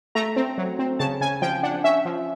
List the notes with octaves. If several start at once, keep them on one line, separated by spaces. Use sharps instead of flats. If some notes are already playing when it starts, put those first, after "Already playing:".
A3 A#5
C4
F#3
C4
C#3 A5
C#3 G#5
F3 G5
D4 F#5
C#4 E5
F3